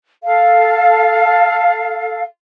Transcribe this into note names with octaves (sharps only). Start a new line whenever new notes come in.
A4 F5